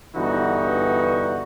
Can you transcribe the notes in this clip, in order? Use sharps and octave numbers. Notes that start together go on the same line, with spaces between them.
G2 D3 E3 B3 D#4 F#4